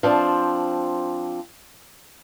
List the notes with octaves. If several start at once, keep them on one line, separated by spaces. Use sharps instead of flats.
F3 C4 D4